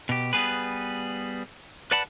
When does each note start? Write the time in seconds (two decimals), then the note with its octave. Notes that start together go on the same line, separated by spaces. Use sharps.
0.09 B2 G4
0.33 G3 B3 G#4 B4
1.91 B4 D5 F#5 A5 B5